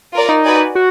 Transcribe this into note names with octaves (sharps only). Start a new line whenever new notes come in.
F4 A#4 D5
D#4
F#4 B4 D5 G#5
F#4